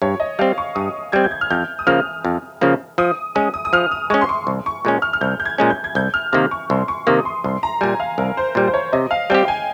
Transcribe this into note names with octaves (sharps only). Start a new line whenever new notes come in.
G2 C#5
D#5
G3 C4 F5
C#6
G2 D#6
G3 C4 G#6
G6
G#6
F6
F2 G6
D#6
C#3 F3 A#3 F6
F2
C#3 F3 A#3
F3 D#6
G#3 C#4 D#6
D#6
D#6
F3 F6
D#6
G#3 C#4 C#6
C6
C#6
C2
C#6
A#2 G#3 C#4
F6
F6
C2 G6
G6
G#6
A#2 G#3 C#4
G6
G#6
C2 G6
F6
C3 D#3 A#3 F6
C#6
C2 C6
C#6
C3 D#3 A#3 D#6
C6
C2 C6
A#5
A#2 G3 G#5
F5
C2 A#4
C5
A#2 G3 C5
C5
C#5
C3 D#5
F5
G3 C4 G4 G5
G#5